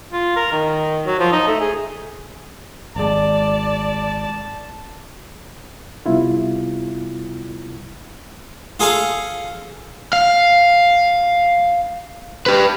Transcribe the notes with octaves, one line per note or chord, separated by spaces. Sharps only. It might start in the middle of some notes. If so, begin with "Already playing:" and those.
F4
A#4
D#3
F#3
F3
D#4
A3
G#4
G#1 G#3 D5 A5
C3 G3 B3 E4 F4
F4 G#4 A4 F5
F5
G4 B4